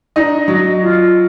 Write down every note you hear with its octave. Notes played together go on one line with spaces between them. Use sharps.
D4 D#4 D#5
F#3 D#5
F4